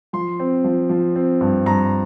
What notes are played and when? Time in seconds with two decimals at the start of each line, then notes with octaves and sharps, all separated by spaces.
0.13 F3 C6
0.40 C4
0.64 F3
0.90 F3
1.16 C4
1.41 G2
1.66 G2 A#5